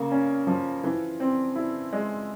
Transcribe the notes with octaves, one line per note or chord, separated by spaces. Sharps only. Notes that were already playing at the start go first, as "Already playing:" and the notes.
Already playing: C#3 A#3
C#4
F3
E3
C4
E4
G#3